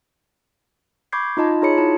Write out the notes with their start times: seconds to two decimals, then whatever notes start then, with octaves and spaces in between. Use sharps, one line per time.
1.12 B5 C#6 D6 G6 G#6 C7
1.37 D#4 F4 D#5 A5 B5
1.62 D#4 F4 G#4 C#5 B5 C#7
1.78 E4 A5